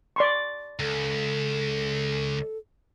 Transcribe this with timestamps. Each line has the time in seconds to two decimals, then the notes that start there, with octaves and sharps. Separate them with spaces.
0.16 D5 C6 C#6
0.79 C#2 A4